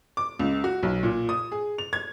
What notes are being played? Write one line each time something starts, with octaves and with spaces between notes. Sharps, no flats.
D6
C#2
F#4
B1
A#2
D#6
G#4
F7
G#6